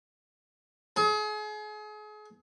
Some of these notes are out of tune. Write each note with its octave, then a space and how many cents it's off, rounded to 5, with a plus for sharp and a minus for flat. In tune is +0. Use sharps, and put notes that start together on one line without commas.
G#4 +35